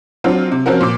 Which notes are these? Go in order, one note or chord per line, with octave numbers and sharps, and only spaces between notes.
F#3 C4 D4 F4
C3
F3 C4 C#4 F#4 A#4
A#2 D6